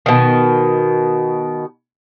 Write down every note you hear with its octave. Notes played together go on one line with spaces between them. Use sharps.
B2 D#3